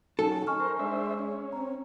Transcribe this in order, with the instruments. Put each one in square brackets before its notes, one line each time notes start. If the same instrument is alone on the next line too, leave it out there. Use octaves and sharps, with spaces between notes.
[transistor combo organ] F#3 [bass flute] C#4 [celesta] D#4 A5 [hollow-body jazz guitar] A4
[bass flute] D#4 [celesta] G#5 C#6 F6
[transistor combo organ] A#4 C5
[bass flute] G#3 [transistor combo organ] D4 C5 E5
[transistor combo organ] C#4
[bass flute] C4 [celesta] A#5